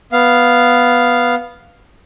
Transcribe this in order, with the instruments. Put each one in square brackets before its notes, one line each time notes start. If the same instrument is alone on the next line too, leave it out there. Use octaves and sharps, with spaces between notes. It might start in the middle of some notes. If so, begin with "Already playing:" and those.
[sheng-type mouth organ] B3 F5